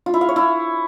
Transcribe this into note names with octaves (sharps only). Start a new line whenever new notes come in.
F4
E4
F5
C#5
E4